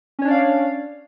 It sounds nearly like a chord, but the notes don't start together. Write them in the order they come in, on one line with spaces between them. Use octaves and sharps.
C#4 C#5 D4 D5 F5